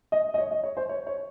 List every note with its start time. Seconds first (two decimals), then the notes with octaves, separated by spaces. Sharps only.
0.12 D#5
0.34 D#5
0.38 C#5
0.51 D#5
0.64 C#5
0.77 C5
0.89 C#5
1.07 C#5